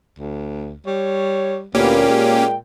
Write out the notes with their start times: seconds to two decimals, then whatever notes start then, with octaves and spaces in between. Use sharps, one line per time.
0.19 D2
0.86 G3 C#5
1.75 D2 A#2 A#3 B3 C#4 G4
2.08 G#3 G5